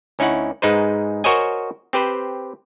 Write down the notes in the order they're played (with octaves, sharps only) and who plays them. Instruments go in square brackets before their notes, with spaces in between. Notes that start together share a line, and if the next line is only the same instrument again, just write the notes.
[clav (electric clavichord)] D2 C#4 D#4 E4 F#5
G#2 G#3 D#4 B4 C5
F#4 A#4 C5 C#5 D#5 G#5
C4 G4 B4 C5